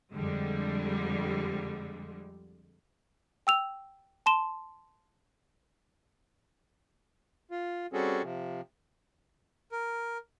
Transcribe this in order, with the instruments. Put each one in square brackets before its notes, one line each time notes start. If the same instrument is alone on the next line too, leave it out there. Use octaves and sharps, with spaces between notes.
[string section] F2 D3 G3 G#3
[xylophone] G5 E6 F7
A5 C6 E7 G7
[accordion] F4
G3 C4 C#4 F#4 G#4 A4
C3 F3
[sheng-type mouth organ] A#4